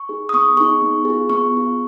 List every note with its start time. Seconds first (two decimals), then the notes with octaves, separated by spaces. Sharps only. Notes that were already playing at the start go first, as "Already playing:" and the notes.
Already playing: C#6
0.09 D#4 G#4
0.29 D#6
0.34 B3 C#6
0.57 D#4 G#4 C#6
0.82 B3
1.05 F4 G#4
1.30 B3 C#6
1.53 F4 G#4